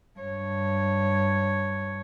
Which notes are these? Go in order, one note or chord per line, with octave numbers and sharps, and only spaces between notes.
G2 C#5